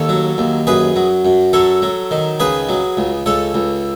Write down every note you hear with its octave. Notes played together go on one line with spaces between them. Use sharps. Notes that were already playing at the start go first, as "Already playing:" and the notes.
Already playing: D#2 A4 C#5
F#3
D#2
F#2 G#4 B4
F#3
F#2
F#3 A4 C#5
F#3
D#3
C#2 G#4 B4
F#3
C#2
C#2 A4 C#5
C#2